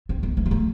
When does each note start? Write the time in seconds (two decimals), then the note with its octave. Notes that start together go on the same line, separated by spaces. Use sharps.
0.09 C4
0.23 B3
0.37 A3
0.46 G3
0.51 A3